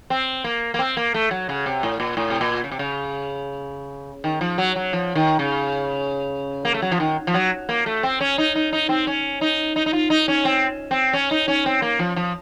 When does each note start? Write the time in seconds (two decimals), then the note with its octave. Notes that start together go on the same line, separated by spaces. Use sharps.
0.10 C4
0.44 A#3
0.74 A#3
0.79 C4
0.97 A#3
1.14 A3
1.31 F#3
1.49 C#3
1.66 C3
1.83 A2
2.00 A#2
2.17 A2
2.30 C3
2.41 A#2
2.64 C#3
2.71 C3
2.79 C#3
4.24 D#3
4.41 F3
4.58 F#3
4.76 F#3
4.93 F3
5.15 D#3
5.39 C#3
6.65 A#3
6.74 A3
6.82 F#3
6.91 F3
7.00 D#3
7.27 F3
7.34 F#3
7.69 A#3
7.86 A3
8.03 C4
8.21 C#4
8.38 D#4
8.56 D#4
8.73 D#4
8.89 C4
9.07 C#4
9.41 D#4
9.76 D#4
9.86 D#4
9.93 F4
10.10 D#4
10.28 C#4
10.45 C4
10.91 C4
11.13 C#4
11.31 D#4
11.48 C#4
11.66 C4
11.82 A#3
11.99 F3
12.16 F3